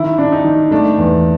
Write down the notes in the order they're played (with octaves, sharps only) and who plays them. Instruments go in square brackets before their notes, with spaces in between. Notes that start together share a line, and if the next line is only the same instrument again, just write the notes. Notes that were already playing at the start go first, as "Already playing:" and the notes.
Already playing: [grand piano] D#3 [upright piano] E4
[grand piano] D4
[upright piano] D#4
[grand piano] D#3
[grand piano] A3 [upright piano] D4
[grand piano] E2